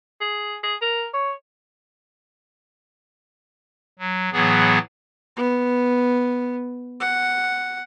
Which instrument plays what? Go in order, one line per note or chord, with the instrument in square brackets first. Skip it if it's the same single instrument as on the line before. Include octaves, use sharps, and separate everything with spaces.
[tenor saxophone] G#4
G#4
A#4
C#5
[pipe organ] F#3
A2 E3 F#3 B3 G#4
[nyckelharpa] B3
F#5